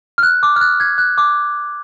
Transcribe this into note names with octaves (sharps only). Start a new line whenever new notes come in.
F6
F#6
D6
F6
F#6
G#6
F#6
D6